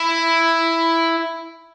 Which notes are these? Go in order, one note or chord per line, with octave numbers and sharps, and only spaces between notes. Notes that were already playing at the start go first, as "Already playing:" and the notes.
Already playing: E4